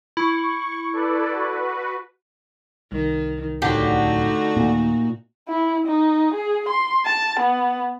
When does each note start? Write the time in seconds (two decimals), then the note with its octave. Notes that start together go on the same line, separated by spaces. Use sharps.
0.17 E4 C#6
0.93 A4 B4 D5
1.32 F#4 B4
2.92 C2 D#3
3.62 D1 D3 A3 D#4 F#4 G4
4.56 D#2 A#2
5.48 E4
5.87 D#4
6.34 G#4
6.69 C6
7.05 A5
7.40 B3